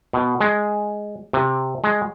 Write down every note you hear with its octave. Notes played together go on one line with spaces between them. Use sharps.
B2
G#3
C3
G#3